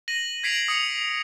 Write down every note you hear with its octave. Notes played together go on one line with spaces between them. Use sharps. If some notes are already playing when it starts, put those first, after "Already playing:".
A#6 D#7 F#7
G#6 B6 C7 D7 F7 F#7
D#6 C#7 F7